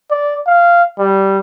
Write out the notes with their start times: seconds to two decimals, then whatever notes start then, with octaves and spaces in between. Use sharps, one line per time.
0.11 D5
0.47 F5
0.99 G3